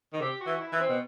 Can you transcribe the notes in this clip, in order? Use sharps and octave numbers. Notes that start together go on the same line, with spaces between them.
D#3
C3 G4
F#4
E3
E4
E3
C4
B2